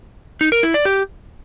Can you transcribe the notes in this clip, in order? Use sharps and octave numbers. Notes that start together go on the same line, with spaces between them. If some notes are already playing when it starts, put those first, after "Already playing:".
D#4
A#4
E4
D5
G4